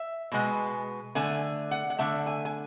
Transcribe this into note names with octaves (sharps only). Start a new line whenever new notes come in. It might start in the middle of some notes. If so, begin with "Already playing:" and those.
Already playing: E5
B2 G#3 B3
D3 A3 G#5
F#5
F#5
D3 A3 E5
G#5
G#5